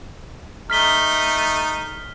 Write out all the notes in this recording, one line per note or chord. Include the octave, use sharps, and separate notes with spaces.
A3 D#4 F6 B6 G7